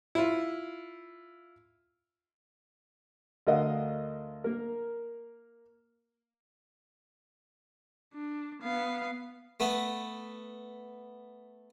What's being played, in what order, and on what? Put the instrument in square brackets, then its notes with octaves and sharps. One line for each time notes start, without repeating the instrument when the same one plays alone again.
[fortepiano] E4 F4
D2 A#4 D#5 F5 F#5
A#3 A#4
[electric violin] D4
B3 F5
[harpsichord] A3 B3